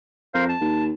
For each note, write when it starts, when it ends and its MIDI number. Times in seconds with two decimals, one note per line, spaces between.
0.34 0.55 41
0.34 0.45 70
0.34 0.45 72
0.34 0.45 77
0.49 0.84 81
0.61 0.92 39